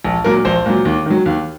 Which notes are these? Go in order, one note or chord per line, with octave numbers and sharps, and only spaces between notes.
A#1
A#2 F#3 A#4
A#1 C5
A#2 F#3
D#2
D#3 F#3
D#2